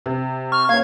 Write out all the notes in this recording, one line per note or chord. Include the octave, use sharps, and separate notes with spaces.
C3
C#6 F6
A#3 C#4 F5 G#6